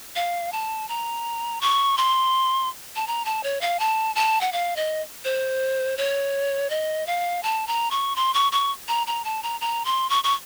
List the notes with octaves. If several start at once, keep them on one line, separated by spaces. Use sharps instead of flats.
F5
A5
A#5
C#6
C6
A5
A#5
A5
C#5
F5
A5
A5
F#5
F5
D#5
C5
C#5
D#5
F5
A5
A#5
C#6
C6
C#6
C#6
A#5
A#5
A5
A#5
A#5
C6
C#6
C#6